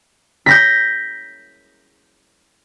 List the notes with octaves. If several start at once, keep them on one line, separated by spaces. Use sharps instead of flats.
G6 A#6 B6